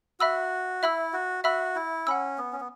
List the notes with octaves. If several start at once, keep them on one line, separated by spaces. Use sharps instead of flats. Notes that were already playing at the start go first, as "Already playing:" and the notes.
F#4 E5 B5 E6
E4 E5 B5 E6
F#4
F#4 E5 B5 E6
E4
C#4 F#5 B5 E6
B3
C#4
B3